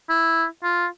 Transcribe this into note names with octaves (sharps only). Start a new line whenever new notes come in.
E4
F4